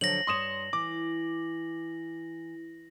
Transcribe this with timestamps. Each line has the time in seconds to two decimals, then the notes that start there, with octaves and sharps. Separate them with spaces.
0.01 D3 F3 F#3 A#6 F#7
0.27 G2 C#5 C6 D#6 E7
0.73 E3 D6